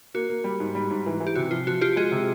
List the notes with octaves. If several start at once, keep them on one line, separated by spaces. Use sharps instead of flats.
A#3 F#4
A#3
G3
G#2
G3
G#2
E3
E3
G4
C3 F#4
F3 F4
F3 F#4
F3 F4 G4
G#3 F#4 G#4
C3